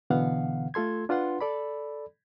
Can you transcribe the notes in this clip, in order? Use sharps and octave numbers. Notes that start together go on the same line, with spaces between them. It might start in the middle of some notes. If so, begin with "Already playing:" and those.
B2 D3 E3 B3 F5 F#5
A3 F4 A4 C6 G#6
D4 F4 B4 F#5 C6
A4 D5 B5